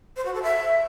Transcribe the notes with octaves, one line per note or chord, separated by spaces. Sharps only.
C5
F#4
A4
E5